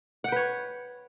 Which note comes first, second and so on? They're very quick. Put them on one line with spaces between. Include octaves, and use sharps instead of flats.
F#5 G5 B4 C#5